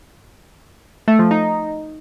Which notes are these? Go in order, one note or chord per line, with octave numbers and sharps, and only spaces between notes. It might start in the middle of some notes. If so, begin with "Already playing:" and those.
A3
F3
D#4